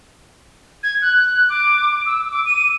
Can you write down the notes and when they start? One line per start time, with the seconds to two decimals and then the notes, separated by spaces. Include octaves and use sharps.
0.83 G#6
1.02 F#6
1.49 D6
2.06 E6
2.31 D6
2.46 D#7